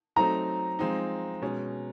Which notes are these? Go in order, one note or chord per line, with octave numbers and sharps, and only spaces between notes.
F#3 A3 C4 D#4 A#5
F3 G#3 C4 D#4
B2 G#3 C#4